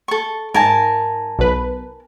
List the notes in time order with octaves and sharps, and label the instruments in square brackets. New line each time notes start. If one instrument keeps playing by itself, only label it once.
[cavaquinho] A4 C#6
[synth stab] G#2 [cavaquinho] A#4 G#5 A5
[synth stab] B1 B4